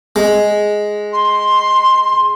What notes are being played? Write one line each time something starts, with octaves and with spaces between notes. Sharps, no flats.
G#3
C6